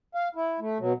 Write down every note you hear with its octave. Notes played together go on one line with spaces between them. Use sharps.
F5
E4
A3
B2 F#3